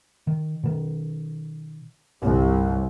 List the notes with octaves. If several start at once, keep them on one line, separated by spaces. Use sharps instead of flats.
D#3
B2 D#3
G1 C2